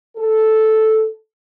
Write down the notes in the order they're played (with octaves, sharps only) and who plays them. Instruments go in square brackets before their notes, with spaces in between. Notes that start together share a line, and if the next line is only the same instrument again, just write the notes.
[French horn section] A4